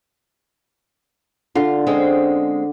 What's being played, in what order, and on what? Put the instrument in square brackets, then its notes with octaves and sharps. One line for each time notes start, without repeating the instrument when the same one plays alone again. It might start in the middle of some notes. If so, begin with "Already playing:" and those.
[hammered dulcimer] D3 [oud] F4
[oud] G#3 C4 C#4